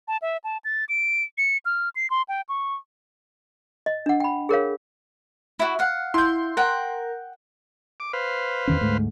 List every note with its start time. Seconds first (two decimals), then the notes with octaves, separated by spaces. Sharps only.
0.08 A5
0.22 E5
0.44 A5
0.65 A6
0.89 D7
1.38 C#7
1.65 F6
1.96 C7
2.10 C6
2.29 G5
2.49 C#6
3.86 D#5
4.06 D4 F#5
4.20 G5 B5
4.49 G#4 A#4 C#5 F5
5.59 E4 F#4
5.79 F5 F#5
6.14 E4 C6 G6
6.57 A#4 F#5 G5
8.00 D6
8.13 B4 C5 F5
8.68 E2 D#3 C#4
8.81 D2 G#2 A3